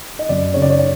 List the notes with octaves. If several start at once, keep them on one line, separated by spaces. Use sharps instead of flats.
D#5
F#2 D5
C#3 C#5
D5
C#5
D5